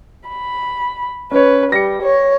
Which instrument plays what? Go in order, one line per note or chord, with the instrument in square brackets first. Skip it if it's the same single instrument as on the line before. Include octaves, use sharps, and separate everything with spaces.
[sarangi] B5
[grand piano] C#4 C#5 [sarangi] B4
[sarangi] G3 [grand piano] A#6 C#7
[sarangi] C#5